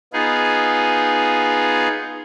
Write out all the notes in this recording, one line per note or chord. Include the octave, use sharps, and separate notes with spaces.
B3 D#4 F4 G#4